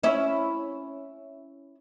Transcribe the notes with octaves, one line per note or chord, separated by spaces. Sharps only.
C#4 E4